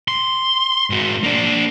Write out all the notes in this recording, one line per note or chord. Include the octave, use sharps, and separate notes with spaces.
C6
G#2 F#4
A#3 D4